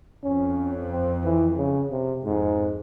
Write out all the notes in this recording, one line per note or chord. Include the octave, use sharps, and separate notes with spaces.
F2 C#4
C4
E3
C#3
C3
F2 G#2